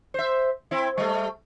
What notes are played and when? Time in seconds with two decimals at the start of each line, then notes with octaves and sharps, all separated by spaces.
0.14 C5 E5
0.71 C4 E4
0.98 G3 A3